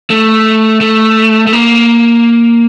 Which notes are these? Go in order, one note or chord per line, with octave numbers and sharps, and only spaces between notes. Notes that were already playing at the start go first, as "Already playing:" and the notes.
A3
A3
A3
A#3